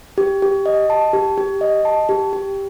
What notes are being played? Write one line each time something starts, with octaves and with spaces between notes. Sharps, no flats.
G4
G4
D#5
A5
G4
G4
D#5
A5
G4
G4